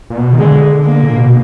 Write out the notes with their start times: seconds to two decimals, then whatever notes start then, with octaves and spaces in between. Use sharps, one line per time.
0.10 A#2
0.17 B2
0.33 D#3
0.39 D3 G#3
0.84 A#3
1.03 A#2
1.16 B2